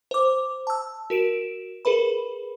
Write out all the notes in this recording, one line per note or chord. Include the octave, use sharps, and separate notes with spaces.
C5 D6
A5 E6
F#4 A#4 D7 E7
G#4 A#4 B4 B5